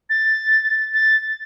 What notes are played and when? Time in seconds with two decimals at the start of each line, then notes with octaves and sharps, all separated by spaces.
0.10 A6
0.94 A6